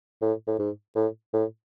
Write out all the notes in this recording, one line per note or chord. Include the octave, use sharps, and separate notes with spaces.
A2
A2
G#2
A2
A2